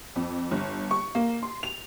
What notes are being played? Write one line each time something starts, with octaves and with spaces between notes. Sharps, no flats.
F2
G1
C#6
A#3
C6
F7